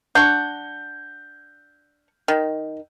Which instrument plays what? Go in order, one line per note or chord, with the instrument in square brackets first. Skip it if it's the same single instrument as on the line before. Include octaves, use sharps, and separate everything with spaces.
[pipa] D4 F#5 C#6 [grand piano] G6
[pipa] D#3